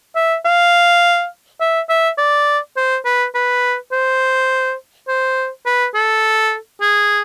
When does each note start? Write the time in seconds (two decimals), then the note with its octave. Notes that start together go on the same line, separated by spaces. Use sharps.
0.16 E5
0.45 F5
1.60 E5
1.89 E5
2.18 D5
2.77 C5
3.05 B4
3.35 B4
3.92 C5
5.08 C5
5.66 B4
5.95 A4
6.81 G#4